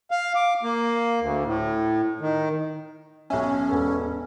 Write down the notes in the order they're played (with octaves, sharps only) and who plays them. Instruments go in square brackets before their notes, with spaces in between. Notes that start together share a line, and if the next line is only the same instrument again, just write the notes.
[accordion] F5
D6
A#3
D2
A2
D#3
[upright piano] B1 E5 [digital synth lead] C#4
[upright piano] E1 B3 A4